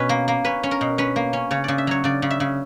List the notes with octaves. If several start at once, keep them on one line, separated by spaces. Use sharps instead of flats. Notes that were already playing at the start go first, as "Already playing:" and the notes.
Already playing: B2 C#4 B4
A#3
A#3
C#4 B4
C#4
A#4
B2
C#4 B4
A#3
C#4
C#3 C#5
C#3 D5
E5
F#3 C#5
C#3 D5
C#3
E5
C#3